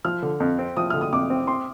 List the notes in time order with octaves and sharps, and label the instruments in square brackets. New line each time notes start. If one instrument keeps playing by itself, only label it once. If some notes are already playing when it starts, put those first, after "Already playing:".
[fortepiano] F3 [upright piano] F6
[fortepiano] D3
F2
C4
[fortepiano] F3 [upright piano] D#6
[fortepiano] D3 [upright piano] F6
[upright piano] D#6
[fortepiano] F2 [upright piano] D6
[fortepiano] C4
[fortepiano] C4 [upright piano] C6